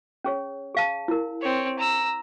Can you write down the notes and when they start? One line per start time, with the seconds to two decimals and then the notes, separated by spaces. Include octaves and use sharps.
0.24 C#4 G#4 C#5
0.75 G#4 F5 A5
1.08 E4 A#4
1.41 C4 C#5
1.79 A#5 E6